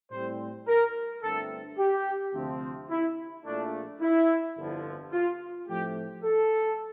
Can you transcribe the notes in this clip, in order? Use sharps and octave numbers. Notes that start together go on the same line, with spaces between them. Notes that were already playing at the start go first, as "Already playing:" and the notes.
A2 G3 C4 C5
A#4
G1 G2 D3 A3 C4 A4
G4
D2 C3 F3 C4
E4
A#1 A#2 A3 D4
E4
G1 F2 D3 F3
F4
A2 F3 A3 C4 G4
A4